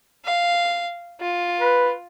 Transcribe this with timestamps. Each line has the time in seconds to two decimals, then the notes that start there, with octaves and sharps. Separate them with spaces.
0.25 F5
1.21 F4
1.59 B4